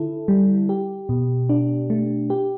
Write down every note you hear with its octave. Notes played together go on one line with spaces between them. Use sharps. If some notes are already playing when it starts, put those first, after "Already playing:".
Already playing: D3 E4 A4
G3
G4
B2
D4
A3
G4